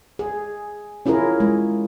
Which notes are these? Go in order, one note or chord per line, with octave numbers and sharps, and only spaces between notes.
G#4
C#4 E4 F4 G#4 A#4
G#3